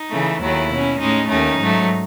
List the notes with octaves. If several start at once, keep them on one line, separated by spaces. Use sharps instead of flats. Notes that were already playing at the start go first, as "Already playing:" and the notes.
Already playing: D#4
C#3 E3 A3
D#2 D#3 F#3 A3 E4
B2 F#3 C#4
A2 G#3 C#4 D#4
D#2 D#3 A3 C#4 D#4
G#2 F#3 A3